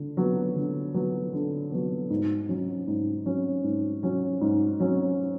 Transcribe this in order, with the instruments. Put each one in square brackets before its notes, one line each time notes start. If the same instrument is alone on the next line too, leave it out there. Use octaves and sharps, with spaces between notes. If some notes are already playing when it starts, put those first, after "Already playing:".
Already playing: [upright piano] D3
F#3 B3
D3
F#3 B3
D3
F#3 B3
G#2
F#3 C#4
G#2
F#3 C#4
G#2
F#3 C#4
G#2
F#3 C#4